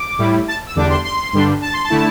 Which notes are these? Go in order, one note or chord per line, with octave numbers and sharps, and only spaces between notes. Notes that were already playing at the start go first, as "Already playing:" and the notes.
Already playing: D6
A2 G3 E4
A5
E6
E2 D3 G3 D4 D6
C6
C6
G2 D3 G3 D4
A5
C6
A5
D3 A3 E4